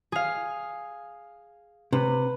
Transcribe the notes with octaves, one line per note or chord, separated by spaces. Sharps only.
G#4 F5
C3 B4